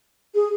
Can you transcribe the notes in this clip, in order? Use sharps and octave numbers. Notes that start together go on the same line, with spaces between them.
G#4